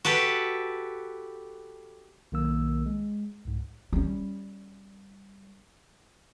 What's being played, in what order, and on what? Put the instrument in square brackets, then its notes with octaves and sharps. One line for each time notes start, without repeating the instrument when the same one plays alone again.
[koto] F#4 G4 A4 B4
[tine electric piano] B1 D#3 A#3 E6
G#3
C2 G#2
[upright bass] G3 C#4